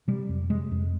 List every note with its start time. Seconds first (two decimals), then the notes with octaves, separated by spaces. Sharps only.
0.08 C3 G3
0.29 F2
0.50 C3 G#3
0.71 F2